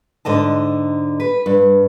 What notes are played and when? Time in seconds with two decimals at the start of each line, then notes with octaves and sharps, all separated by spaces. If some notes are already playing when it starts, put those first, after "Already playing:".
0.25 G#2 D3 D#5 A5
1.20 B4
1.46 G2